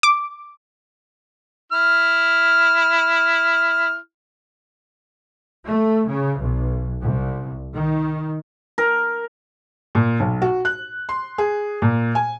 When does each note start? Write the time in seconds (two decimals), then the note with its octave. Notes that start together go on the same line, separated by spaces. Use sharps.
0.03 D6
1.72 E4 F6
5.66 A3
6.08 C#3
6.41 B1
7.02 C2
7.75 D#3
8.78 A#4
9.95 A#2
10.20 B1
10.42 F#4
10.65 F#6
11.09 C6
11.38 G#4
11.82 A#2
12.15 G#5